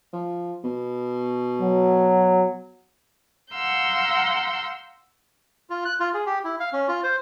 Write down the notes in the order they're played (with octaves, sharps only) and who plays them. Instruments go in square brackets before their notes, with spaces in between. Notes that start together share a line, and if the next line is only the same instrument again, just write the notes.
[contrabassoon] F3
B2
[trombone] F#3
[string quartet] F5 F#5 A#5 C6 E6 G6
[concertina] F4
F#6
F4
G#4
G4
E4
F5
C#4
F4
C5